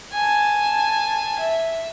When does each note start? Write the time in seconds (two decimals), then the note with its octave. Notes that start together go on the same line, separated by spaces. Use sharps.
0.13 G#5 A5
1.39 E5